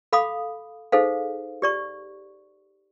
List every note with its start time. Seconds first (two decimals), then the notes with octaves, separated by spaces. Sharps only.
0.13 A4 F5 B5 D6 D#6
0.92 D#4 G#4 A4 C5 F5
1.62 G4 D5 C#6